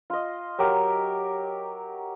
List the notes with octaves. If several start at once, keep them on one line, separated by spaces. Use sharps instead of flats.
F4 D#5
F#3 G4 A#4